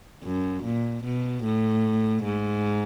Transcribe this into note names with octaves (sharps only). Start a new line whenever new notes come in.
F#2
A#2
B2
A2
G#2